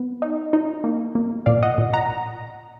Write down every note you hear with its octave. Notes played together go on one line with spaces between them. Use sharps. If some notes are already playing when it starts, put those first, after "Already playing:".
Already playing: B3
D#4
D#4
A#3
A#3
A#2 D5 F5
D#5 F#5
A#2
F#5 A#5